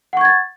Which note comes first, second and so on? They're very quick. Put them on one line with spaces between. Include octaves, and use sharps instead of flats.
F#5 C#6 G#6 A6